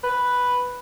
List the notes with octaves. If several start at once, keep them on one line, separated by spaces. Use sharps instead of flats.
B4